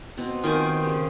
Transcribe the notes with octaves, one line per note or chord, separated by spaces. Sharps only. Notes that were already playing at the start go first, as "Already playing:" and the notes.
B2 C4
D#3 C4 F4 G#5
C#3 G4